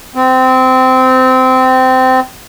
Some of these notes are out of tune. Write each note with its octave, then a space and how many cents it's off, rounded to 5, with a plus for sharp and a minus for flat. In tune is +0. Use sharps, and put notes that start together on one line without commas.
C4 -20